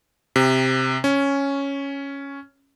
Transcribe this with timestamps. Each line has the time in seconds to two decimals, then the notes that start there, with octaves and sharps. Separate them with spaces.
0.36 C3
1.04 C#4